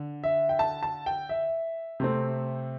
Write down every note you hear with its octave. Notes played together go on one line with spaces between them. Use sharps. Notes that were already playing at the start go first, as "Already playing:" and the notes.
Already playing: D3
E5
G5
A5
A5
G5
E5
C3 A3 C4